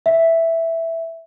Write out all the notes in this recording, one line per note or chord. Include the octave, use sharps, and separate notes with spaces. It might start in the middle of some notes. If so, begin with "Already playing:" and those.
E5